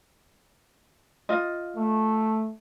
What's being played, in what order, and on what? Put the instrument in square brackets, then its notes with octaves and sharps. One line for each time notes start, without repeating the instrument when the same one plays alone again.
[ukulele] F4 D#5
[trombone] A3